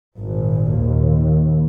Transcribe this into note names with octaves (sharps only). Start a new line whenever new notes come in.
G#1 A#2
D#2